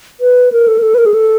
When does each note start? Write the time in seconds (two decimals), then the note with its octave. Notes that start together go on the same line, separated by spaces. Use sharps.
0.20 B4
0.52 A#4
0.68 A4
0.78 A#4
0.82 A4
0.94 B4
0.98 A#4
1.06 G#4
1.14 A4